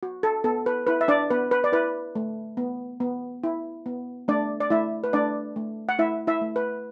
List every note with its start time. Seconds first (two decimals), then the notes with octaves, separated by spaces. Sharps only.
0.03 F#4
0.23 A4
0.44 B3 A4
0.66 B4
0.87 E4 B4
1.01 E5
1.08 D4 D5
1.30 B3 B4
1.51 B4
1.64 D5
1.72 E4 B4
2.15 A3
2.57 B3
3.00 B3
3.44 E4
3.86 B3
4.28 A3 D4 D5
4.60 D5
4.70 A3 E4 E5
5.04 B4
5.13 A3 D4 D5
5.56 A3
5.89 F#5
5.99 A3 E4 E5
6.27 E4 E5
6.41 A3
6.56 B4